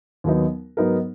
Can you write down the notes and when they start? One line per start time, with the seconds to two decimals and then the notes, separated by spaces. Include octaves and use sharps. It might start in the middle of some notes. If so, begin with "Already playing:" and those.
0.24 D#2 D#3 F#3 B3 D#4
0.77 G#2 F#3 B3 D#4 A#4